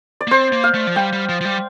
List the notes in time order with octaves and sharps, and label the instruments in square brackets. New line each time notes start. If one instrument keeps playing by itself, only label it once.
[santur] D5
[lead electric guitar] A#3
[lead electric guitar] C4 [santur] C5
[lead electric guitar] A#3
[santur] F5
[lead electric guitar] A3
F3
[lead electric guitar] G3 [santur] G5
[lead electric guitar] G3
F3
F3
G3